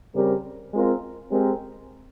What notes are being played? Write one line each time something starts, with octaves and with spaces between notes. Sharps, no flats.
C#3 G3 C4 G4 A#4
G#3 C4 F4 A#4
G#3 C4 G4 A#4